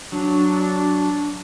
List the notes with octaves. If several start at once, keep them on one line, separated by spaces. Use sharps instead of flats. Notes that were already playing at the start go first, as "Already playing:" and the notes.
F#3 D4